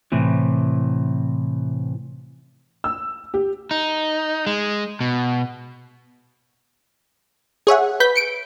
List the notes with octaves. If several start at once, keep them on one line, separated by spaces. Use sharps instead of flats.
A2 C3 E3
E6
G4
D#4
G#3
B2
G#4 C#5 E5 F#5
B4 G6 B6
C#7 D7